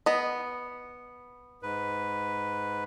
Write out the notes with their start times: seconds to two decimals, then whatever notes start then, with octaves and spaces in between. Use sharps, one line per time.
0.06 B3 D#5
1.63 G#2 B4